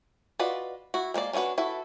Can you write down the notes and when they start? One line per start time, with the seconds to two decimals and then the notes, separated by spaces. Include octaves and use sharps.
0.39 F4 F#4 B4 D5 D#5
0.94 E4 F#4
1.14 G#3 A#3 A4 D5
1.33 C#4 D4 E4 F#4 B4
1.58 E4 F#4 A4 B4